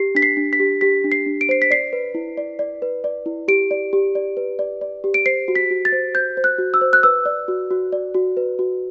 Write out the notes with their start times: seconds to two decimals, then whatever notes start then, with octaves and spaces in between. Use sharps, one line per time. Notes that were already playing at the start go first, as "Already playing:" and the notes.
Already playing: G4 C7
0.15 D4 B6
0.22 C7
0.37 D4
0.53 B6
0.60 G4
0.81 G4 B6
1.04 D4
1.12 C7
1.26 D4
1.41 D7
1.49 C5 C7
1.62 B6
1.70 D5 C7
1.93 B4
2.15 E4
2.37 D5
2.59 D5
2.82 B4
3.04 D5
3.26 E4
3.48 G4 D7
3.71 D5
3.93 G4
4.15 D5
4.37 B4
4.59 D5
4.81 D5
5.04 G4
5.14 D7
5.26 C5 C7
5.48 F#4
5.55 B6
5.70 F#4
5.85 A6
5.92 C5
6.14 C5 G6
6.37 C5
6.44 F#6
6.58 F#4
6.74 E6
6.81 C5
6.93 F#6
7.03 B4 E6
7.26 D5
7.48 F#4
7.71 F#4
7.92 D5
8.14 F#4
8.37 B4
8.59 F#4